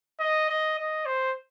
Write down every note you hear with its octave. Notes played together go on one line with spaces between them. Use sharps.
D#5
D#5
D#5
C5